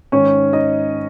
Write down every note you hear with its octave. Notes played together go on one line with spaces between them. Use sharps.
G#2 D#3 C#4 C#5
D#4 D#5